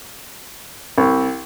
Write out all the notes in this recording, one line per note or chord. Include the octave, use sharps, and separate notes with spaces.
C2